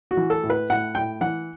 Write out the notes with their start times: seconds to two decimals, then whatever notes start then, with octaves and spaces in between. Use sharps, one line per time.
0.11 F#4
0.17 E3
0.30 A4
0.44 A2
0.50 B4
0.70 A2 F#5
0.95 A2 G5
1.21 E3 F#5